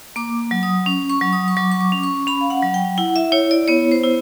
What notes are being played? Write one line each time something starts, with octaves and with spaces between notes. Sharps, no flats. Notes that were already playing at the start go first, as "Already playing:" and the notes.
A#3 D6
F#3
D#6
C#4
C#6
F#3
D#6
C#6
F#3 D6
C#6
D6
C#4
C#6
C#4 B5
F5
F#5
F#3
G5
E4 F#5
E5
E4 C#5
D5
B3 C#5
C5
E4